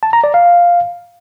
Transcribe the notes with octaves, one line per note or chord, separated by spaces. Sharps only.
A5
A#5
D5
F5